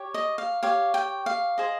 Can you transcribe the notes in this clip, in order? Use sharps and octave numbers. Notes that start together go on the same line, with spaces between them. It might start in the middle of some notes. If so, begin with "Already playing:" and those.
Already playing: G4 C#5
D#5
F5
G4 C#5 F5
G5
F5
G#4 C5 D#5